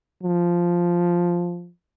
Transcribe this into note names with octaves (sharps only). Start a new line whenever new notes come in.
F3